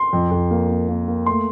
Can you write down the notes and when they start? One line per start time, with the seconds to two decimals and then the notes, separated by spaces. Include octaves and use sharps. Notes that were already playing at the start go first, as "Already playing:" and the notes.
Already playing: C6
0.13 F2
0.31 F2
0.51 A#3
0.70 A#3
0.89 A#3
1.08 A#3
1.26 A3 C6